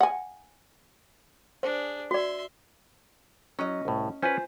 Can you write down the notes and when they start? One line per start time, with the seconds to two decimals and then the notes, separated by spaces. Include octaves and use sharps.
0.01 F#5 G#5
1.63 D4 G#4 C5
2.11 F#4 D5 E5 C6
3.59 F#3 C#4 D#5
3.85 C2 A2
4.22 C#4 F4 B4 C5 G#5